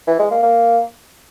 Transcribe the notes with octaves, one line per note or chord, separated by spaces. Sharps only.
E3
G#3
A#3
A#3